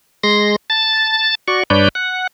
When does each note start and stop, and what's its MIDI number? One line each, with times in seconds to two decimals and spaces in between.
0.24 0.56 56
0.24 0.56 84
0.24 0.56 94
0.70 1.35 81
0.70 1.35 93
1.48 1.63 66
1.48 1.63 74
1.48 1.63 85
1.70 1.89 43
1.70 1.89 62
1.70 1.89 71
1.70 1.89 73
1.70 1.89 74
1.70 1.89 91
1.95 2.27 78